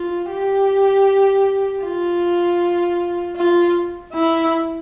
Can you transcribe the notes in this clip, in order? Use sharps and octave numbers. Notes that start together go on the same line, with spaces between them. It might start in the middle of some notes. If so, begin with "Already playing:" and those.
Already playing: F4
G4
F4
F4
E4